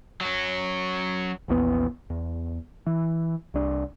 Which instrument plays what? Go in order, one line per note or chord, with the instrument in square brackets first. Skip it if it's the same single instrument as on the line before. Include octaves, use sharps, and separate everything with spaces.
[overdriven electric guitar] F#3 C#4
[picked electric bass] A#1 E2 D3 B3
E2
E3
C2 D4